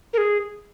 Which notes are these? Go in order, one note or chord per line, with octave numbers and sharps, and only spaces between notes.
A#4
G#4